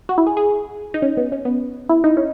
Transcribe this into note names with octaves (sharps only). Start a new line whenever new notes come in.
F#4
E4
G#4
G#4
D#4
C#4
B3
C#4
B3
E4
D#4
C#4